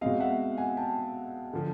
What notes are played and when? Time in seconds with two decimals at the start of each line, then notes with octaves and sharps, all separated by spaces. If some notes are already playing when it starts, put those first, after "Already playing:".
0.01 B2 G#3 C4 D#5 F5
0.20 E5 F#5
0.58 F#5 G#5
0.77 G5 A5
1.53 D3 F3